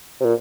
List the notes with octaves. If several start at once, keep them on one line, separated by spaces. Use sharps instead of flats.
C3
A#2